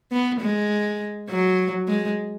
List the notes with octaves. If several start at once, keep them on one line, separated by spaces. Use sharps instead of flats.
B3
G#3
F#3
G#3